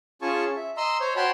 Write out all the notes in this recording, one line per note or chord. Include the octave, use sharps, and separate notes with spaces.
C#4 F4 G#4 G#5 A5 C#6
E5
D#5 A#5 C6 E6
C5 C#5
F#4 C#5 G5 A5 B5 C6